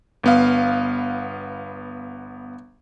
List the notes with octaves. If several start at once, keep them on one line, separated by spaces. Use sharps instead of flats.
G1 B3 F5